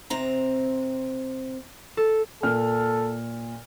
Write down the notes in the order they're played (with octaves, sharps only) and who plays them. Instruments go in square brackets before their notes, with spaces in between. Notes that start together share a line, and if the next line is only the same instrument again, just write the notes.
[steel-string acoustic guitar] C3 C4 A#5
[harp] A4
[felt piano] A#2 F6 [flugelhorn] A4